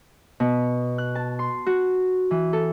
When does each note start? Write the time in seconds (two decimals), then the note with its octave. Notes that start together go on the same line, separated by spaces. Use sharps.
0.40 B2
0.98 F#6
1.15 A5
1.39 C6
1.66 F#4
2.31 E3
2.53 A4